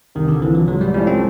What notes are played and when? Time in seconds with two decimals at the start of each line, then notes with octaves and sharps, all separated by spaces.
0.15 C2 D#3
0.28 D3
0.42 C3 E3 F3
0.55 F#3
0.68 G#2 F#3
0.81 G3
0.94 F3 G3 A3 C#4 E4
1.07 C4